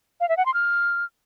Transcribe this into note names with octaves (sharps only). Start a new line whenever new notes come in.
F5
E5
F#5
C6
F6